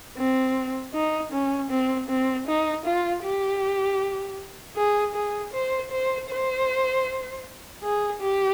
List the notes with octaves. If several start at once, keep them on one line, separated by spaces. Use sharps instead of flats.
C4
D#4
C#4
C4
C4
D#4
F4
G4
G#4
G#4
C5
C5
C5
G#4
G4